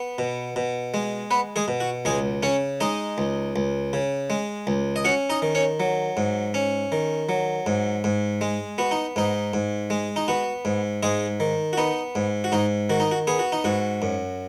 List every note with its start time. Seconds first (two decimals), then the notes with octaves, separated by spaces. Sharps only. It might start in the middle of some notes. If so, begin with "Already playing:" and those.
Already playing: B3
0.18 B2
0.56 B2
0.94 G#3
1.31 B3 B4
1.56 G#3 G#4
1.68 B2
1.80 F#4
2.05 C#2 G#3 G#4
2.43 C#3 C#4 C#5
2.80 G#3 D#4 D#5
3.18 C#2
3.56 C#2
3.93 C#3
4.30 G#3
4.67 C#2
4.96 D#5
5.05 C#4 F#4 F#5
5.30 D#4 D#5
5.42 D#3
5.55 C#4 C#5
5.80 F#3
6.17 G#2
6.54 C#4
6.92 D#3
7.29 F#3
7.66 G#2
8.04 G#2
8.41 G#3
8.78 B3 F#4
8.91 D#4
9.16 G#2 D#4
9.54 G#2
9.90 G#3
10.16 D#4
10.28 B3 F#4
10.65 G#2
11.03 G#2 G#3 G#4
11.40 D#3
11.73 F#4
11.77 B3 D#4
12.15 G#2
12.44 F#4
12.52 G#2 D#4
12.90 D#3 F#4
13.00 D#4
13.12 F#4
13.27 B3 G#4
13.39 F#4
13.52 D#4
13.64 G#2 F#4
14.02 F#2